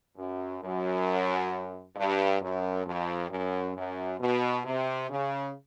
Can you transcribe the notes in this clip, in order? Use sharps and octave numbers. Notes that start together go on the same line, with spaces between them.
F#2
F#2
G2
F#2
F2
F#2
F#2
B2
C3
C#3